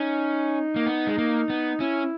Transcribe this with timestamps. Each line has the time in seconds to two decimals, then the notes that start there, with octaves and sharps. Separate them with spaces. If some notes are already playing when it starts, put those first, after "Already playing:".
Already playing: C#4 D#4
0.76 A#3
0.86 B3
1.07 G#3
1.18 A#3
1.50 B3
1.80 C#4 E4